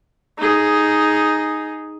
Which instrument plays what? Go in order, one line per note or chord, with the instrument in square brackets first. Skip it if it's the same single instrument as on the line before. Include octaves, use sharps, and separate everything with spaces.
[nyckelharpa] D#4 G#4